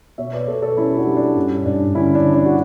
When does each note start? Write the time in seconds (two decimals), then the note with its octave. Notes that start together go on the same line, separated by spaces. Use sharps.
0.18 B2 C#5 E5
0.33 B4 D5
0.47 B2 A4 C#5
0.62 A4 C#5
0.77 G3 C#4 E4
0.88 G4
0.97 D4 F#4
1.06 G3
1.17 D4
1.36 G2 C#4
1.66 G2 D4
1.95 D3 C#4 E4
2.15 D4
2.25 D3
2.35 D4
2.45 F#4